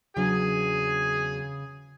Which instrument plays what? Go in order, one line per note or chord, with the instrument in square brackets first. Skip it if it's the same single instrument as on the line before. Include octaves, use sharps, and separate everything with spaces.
[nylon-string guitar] E2 F#3 D4 [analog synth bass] C#3 [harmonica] G#4 G#5